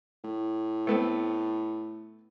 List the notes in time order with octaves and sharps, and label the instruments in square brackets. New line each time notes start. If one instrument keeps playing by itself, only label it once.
[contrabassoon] A2
[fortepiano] A3 B3 C4